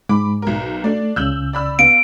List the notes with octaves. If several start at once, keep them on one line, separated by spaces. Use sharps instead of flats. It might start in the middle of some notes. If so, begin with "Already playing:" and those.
G#2 B5 D6
B1 A#4
A3 D4 D5
C#2 C#3 E6 G6 F#7
D5 B5 E6
B3 F5 D7